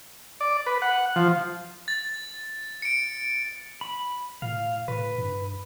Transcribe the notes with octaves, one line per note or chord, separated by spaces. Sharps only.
D5
B4
F#5
F3
A6
C#7 D7
B5
A2 F5
A2 B4
G2